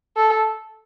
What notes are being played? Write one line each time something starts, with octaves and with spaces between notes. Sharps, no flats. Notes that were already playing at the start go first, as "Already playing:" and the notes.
A4